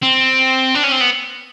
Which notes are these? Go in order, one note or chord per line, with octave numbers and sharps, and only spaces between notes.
C4
D4
C#4
C4
B3